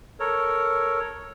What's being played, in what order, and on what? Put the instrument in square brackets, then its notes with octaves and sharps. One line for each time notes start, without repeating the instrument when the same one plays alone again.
[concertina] A4 A#4 C#5